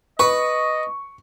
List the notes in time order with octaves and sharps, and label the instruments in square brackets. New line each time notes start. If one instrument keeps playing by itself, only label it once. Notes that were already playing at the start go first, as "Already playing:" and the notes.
[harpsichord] B4 [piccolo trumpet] D#5 [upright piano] C#6